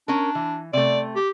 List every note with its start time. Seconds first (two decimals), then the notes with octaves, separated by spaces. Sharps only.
0.08 C#4 D4 A#4
0.35 E3
0.73 C3 A3 D5
1.16 G4